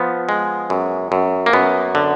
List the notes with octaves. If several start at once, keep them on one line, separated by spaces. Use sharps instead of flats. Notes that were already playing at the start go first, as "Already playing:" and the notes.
Already playing: F3 B3
G#3
F#2
F#2
A#3
F#2 B3
D3